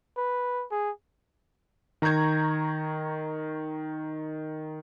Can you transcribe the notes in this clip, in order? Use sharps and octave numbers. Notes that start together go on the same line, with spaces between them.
B4
G#4
D#3 A#5 C#6 G6 G#6